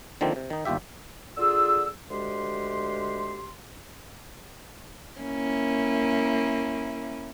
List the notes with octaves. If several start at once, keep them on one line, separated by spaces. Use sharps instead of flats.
D3 D#3 F3 A#3 C4
C3
D#3 D#4
G1 D#2 F4 G4 E5
D3 F4 G#4 E6
D2 G#3 G4 C6
A#3 C#4 E4